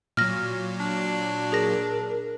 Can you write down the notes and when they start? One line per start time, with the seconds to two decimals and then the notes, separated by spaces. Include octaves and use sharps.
0.17 A#2 F#3 F6 A#6
0.80 D4
1.52 G#4 A#4 A#6